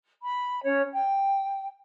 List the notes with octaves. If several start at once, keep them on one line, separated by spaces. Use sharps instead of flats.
B5
C#4 C#5
G5